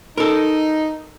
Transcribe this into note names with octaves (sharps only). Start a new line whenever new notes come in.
D#4 A4 A#4